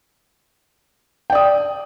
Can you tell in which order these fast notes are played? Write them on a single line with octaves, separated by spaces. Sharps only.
G5 D5 D#6